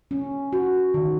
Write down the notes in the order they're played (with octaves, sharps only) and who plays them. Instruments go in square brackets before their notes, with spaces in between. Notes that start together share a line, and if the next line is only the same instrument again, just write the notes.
[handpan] C#4
F#4
D#3